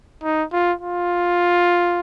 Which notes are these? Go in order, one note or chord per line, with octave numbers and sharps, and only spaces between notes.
D#4
F4
F4